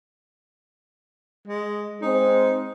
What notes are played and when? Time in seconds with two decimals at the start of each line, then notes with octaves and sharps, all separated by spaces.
1.48 G#3
2.02 G#3 C4 D#4